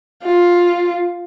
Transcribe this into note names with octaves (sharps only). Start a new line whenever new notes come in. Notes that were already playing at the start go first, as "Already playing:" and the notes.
F4